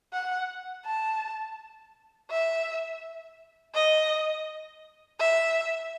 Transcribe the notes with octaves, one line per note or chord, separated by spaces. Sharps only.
F#5
A5
E5
D#5
E5